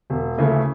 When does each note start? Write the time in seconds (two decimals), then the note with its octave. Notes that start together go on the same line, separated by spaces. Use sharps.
0.10 E1
0.37 D2 C#3 E3 A3